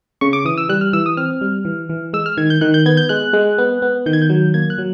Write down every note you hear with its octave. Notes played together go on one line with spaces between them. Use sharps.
C#3 C#6
D6
E3 D#6
E6
G3 F#6
F6
E3 E6
D#6
C4 F6
G3
E3
E3
G#3 E6
F6
D#3 G#6
G6
D#3 F#6
G6
B3 G#6
G6
G#3 F#6
G#3
B3
B3
D#3 G6
G#6
G6
F#3
A#3 G#6
F#6
F#3